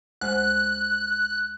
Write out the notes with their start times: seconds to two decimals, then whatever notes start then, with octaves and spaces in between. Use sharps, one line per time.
0.21 D2 G#3 C5 F#6